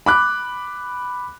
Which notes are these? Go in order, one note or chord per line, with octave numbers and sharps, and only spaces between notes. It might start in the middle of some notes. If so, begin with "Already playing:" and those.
B5 D6 F#6